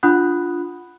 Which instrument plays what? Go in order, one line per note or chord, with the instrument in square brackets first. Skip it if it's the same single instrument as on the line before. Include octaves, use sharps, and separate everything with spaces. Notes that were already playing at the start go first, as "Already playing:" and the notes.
[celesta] D4 F4 F#5 B5 D#6 F#6